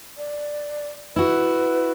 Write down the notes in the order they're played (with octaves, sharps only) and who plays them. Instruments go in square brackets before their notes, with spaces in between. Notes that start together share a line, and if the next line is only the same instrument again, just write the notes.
[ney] D5
[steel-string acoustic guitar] E4 F#4 [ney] B4